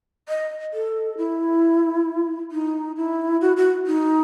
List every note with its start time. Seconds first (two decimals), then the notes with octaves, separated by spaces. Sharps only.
0.29 D#5
0.74 A4
1.18 E4
2.52 D#4
2.97 E4
3.41 F#4
3.57 F#4
3.87 D#4